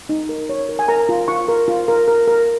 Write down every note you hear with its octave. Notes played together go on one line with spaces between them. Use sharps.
D#4
A#4
C#5
A#4
G#5
A#4 A#5
F4
F4 C#6
A#4
F4
A#4
A#4
A#4